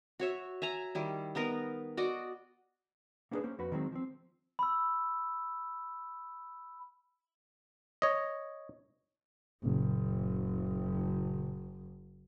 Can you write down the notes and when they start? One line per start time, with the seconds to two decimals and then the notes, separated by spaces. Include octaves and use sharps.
0.19 F#4 C#5 E5
0.62 E5 G#5 A#5
0.95 D#3 G3 E4
1.35 B3 D#4 A#4 B4
1.97 F#4 D5 D#5
3.31 A#3 B3 D4 G4 G#4 B4
3.44 A#3 C#4 C5
3.59 F2 F#4 B4
3.72 D#3 F#3 G#3 C4
3.92 F3 C4
4.59 B5 E6
8.02 C#5 D#5
9.64 F#1 A#2 C#3